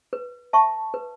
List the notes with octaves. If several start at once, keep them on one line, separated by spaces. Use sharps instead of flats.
B4
E5 A5 C#6
B4